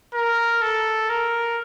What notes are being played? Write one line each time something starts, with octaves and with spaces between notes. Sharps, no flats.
A#4
A4
A#4